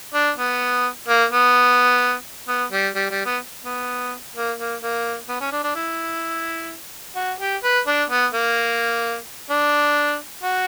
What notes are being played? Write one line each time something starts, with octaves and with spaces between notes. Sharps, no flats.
D4
B3
A#3
B3
B3
G3
G3
G3
B3
B3
A#3
A#3
A#3
B3
C#4
D4
D4
E4
F#4
G4
B4
D4
B3
A#3
D4
F#4